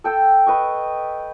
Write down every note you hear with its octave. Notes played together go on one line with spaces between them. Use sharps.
A4 G5 E6
B4 D#5 C#6